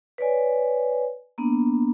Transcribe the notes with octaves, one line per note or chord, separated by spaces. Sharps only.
B4 C#5 D5 G#5
A#3 B3 D4